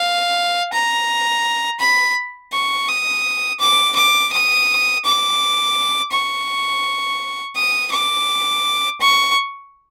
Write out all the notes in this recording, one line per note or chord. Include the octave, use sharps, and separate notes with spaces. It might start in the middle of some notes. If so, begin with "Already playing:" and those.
Already playing: F5
A#5
B5
C#6
D#6
D6
D6
D#6
D6
C#6
D#6
D6
C#6